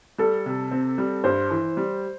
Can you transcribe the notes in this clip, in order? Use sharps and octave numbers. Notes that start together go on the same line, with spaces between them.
G3 A4
C3
C4
G3
G2 C5
E3
G3